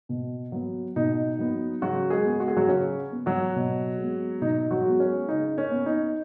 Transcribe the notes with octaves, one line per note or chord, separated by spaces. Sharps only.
B2
F#3 B3
B2 D#4
F#3 B3
C#3 F#3 F#4
G#3 G#4
B3
F#4
G#4
F#3 F#4
C#3 C#4
B3
F#3 F#4
B2
G#3 B3
B2 D#4
F#3 F#4
G#3 B3
C#4
C#3 D#4
C#4
B3
D#4